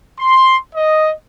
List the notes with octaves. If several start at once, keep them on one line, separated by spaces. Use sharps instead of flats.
C6
D#5